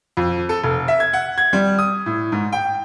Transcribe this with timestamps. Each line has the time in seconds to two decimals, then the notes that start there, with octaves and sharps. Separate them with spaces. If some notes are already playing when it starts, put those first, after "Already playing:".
0.17 F2
0.49 A4
0.63 F1
0.88 E5
1.00 G#6
1.13 F#5
1.38 G#6
1.53 G3
1.79 D#6
2.06 A2
2.32 G#2
2.52 G5